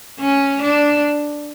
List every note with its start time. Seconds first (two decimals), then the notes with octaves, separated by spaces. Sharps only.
0.20 C#4
0.62 D4